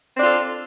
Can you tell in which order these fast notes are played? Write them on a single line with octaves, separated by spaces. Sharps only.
C4 D4 F4 A4